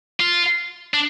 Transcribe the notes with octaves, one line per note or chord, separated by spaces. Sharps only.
F4
D4